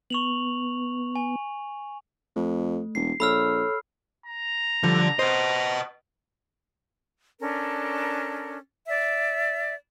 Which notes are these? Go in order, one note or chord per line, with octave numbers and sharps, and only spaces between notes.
B3 C#6 F7 F#7
G#5
F2 A3
E1 C7
A#1 A4 C#5 B5 E6 F6
A#5
D3 F3 G3
B4 C5 D#5
C#4 D4 A4 A#4
D5 E5